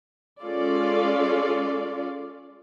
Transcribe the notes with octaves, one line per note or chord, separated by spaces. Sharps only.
G#3 C#4 F4 A4 D5